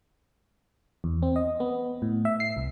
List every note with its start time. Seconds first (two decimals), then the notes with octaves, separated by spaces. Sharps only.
1.04 E2
1.22 C4
1.36 D#5
1.60 B3
2.02 A2
2.25 E5
2.40 C7
2.57 C2